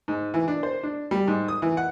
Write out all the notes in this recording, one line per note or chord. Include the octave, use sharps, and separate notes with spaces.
G#2
E3
D4
C5
D4
G3
G#2
D#6
E3
F#5